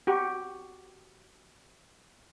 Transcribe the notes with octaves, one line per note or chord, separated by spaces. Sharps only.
F#4 G4